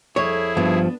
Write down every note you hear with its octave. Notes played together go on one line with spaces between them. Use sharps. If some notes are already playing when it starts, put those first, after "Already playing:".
F2 E4 G#4 C#5
G2 F3 B3 D4